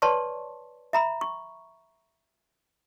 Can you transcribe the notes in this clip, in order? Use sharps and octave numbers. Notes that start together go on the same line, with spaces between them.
B4 C#5 D5 A5 C6 C#6
E5 A#5 B5
C#6